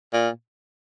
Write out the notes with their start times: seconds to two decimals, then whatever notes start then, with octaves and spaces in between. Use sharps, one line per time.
0.13 A#2